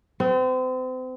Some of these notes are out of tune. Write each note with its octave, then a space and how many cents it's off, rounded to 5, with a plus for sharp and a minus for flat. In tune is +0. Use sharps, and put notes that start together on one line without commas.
C4 -35